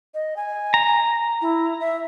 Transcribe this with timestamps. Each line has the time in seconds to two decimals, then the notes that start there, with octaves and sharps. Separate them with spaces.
0.14 D#5
0.36 G#5
0.74 A#5
1.41 E4
1.80 E5